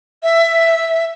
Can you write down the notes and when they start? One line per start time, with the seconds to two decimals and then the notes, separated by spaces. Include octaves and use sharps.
0.23 E5